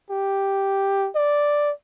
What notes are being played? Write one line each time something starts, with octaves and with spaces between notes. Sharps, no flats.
G4
D5